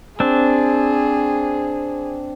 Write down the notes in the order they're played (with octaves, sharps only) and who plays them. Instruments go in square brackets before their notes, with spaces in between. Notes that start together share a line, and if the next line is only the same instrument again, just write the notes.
[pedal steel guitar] C4 D4 [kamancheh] G#4